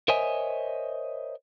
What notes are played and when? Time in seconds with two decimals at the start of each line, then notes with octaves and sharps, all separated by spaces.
0.08 A#4 C5 C#5 D#5 E5 G#5